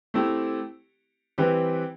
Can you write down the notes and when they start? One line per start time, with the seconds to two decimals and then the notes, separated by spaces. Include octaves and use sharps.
0.14 A3 C4 E4 G4
1.38 E3 G3 C4 G4 B4